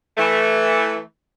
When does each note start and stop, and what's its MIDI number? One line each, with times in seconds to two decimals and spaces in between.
0.17 0.99 52
0.17 0.99 57